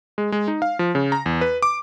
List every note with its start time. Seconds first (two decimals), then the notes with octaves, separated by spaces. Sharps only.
0.18 G#3
0.32 G#3
0.48 D#4
0.62 F5
0.79 F3
0.95 C#3
1.12 A#5
1.26 E2
1.41 B4
1.63 D6